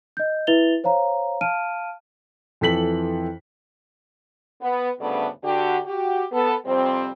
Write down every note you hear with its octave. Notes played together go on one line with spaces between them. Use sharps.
D#5 G6
E4 B4 E5 A6 F7 G7
C5 C#5 F5 A#5
F5 A5 F6 D7 D#7
F2 E3 A4 B6 F#7
B3
D2 G2 C#3 A3 B3 D5
D3 F#4 G4
F#4 G4
B3 A4
F2 C3 G3 C4